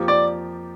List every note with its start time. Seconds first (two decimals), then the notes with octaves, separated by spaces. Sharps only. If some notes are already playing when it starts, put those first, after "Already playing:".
Already playing: F2 F3 A#3 G4
0.08 D5